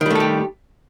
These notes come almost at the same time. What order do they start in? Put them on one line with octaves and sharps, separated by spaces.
D#3 G3 A3 A4 G4